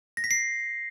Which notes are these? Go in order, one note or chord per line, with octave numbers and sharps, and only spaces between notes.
A#6
B6
C7